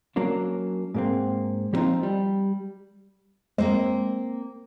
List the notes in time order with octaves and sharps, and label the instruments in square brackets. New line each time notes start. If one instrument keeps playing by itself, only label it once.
[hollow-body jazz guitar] F#3 A#3 C#4 D4
G#2 A#3 C4
F3 G3 A#3 C4 D#4 F4
G3
[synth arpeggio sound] G#3 [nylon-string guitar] A#3 C4 C5